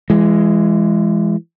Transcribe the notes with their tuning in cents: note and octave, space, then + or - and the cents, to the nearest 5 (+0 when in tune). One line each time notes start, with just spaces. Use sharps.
E3 +35 G#3 +0